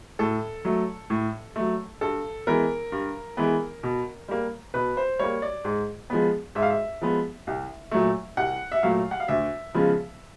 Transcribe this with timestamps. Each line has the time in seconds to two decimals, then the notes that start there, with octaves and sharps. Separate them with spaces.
0.19 A2 A4
0.65 F#3 A3
1.10 A2
1.56 F#3 A3
2.01 G2 A4
2.47 E3 G#3 B3 A#4
2.92 G2
3.37 E3 G#3 B3
3.83 B2
4.28 G3 A#3
4.74 B2 B4
4.97 C5
5.19 G3 A#3 C#5
5.42 D5
5.65 G#2
6.10 F3 G#3 B3
6.55 G#2 E5
6.63 F5
6.70 E5
7.02 F3 G#3 B3
7.47 C2
7.91 A#2 F#3 A3
8.37 C2 F#5
8.72 E5
8.83 A#2 F#3 A3 F5
9.11 F#5
9.20 F5
9.28 D2 E5
9.74 C#3 F3 G#3 B3